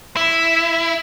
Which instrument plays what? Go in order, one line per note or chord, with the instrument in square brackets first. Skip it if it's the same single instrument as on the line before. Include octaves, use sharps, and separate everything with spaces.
[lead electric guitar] E4